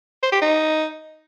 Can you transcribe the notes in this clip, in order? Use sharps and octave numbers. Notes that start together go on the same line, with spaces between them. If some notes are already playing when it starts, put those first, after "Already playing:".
C5
G4
D#4